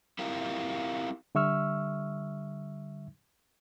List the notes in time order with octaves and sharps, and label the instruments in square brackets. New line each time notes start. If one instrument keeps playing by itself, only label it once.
[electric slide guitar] C4 E4 F4 G4 A#4
[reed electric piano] D3 G3 E5 C#6 E6 F6